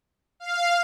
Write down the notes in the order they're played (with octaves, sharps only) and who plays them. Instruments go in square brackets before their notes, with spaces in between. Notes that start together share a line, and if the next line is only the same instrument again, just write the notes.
[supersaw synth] F5